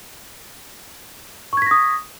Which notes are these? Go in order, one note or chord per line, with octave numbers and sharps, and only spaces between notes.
C#6 D#6 G#6 A#6 B6